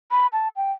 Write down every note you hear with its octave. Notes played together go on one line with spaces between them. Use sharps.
B5
A5
G5